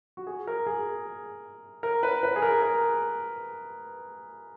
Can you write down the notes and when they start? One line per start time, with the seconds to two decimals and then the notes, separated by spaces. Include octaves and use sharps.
0.17 F#4
0.27 G#4
0.47 A#4
0.67 G#4
1.83 A#4
2.03 B4
2.23 B4
2.36 G#4
2.42 A#4
2.62 A#4